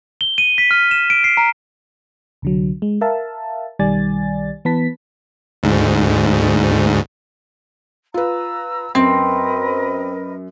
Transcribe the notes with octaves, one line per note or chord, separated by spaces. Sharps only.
G7
D#7
B6
F6
E7
D7
C7
A#5
C2 D3 F#3
G#3
A#4 E5 F5 A5
B1 D#3 G3 D5 G#5 A6
E3 B3 B4 A5 B6
D2 G#2
F4 B4 A#5 E6
F#2 C4 A#4 B4 D#5